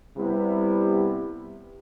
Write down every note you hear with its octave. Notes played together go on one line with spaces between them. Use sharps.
C3 G3 B3 E4 G4